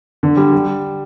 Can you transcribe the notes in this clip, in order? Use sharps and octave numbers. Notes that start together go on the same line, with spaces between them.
D3
G3
G3